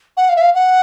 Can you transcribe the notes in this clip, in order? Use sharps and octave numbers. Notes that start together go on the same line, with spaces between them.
F#5
F5
E5
F5
F#5